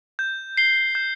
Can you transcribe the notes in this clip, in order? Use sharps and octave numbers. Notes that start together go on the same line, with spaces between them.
G6
C7 G7
G6